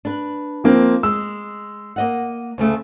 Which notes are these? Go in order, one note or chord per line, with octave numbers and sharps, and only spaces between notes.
D4 B4
F3 A#3 C4
G#3 E6
A#3 D#5 F#5
D2 C#3 A3